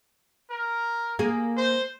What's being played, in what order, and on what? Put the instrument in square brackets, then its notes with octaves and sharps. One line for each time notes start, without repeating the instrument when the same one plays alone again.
[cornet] A#4
[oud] A#3 G#4
[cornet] C5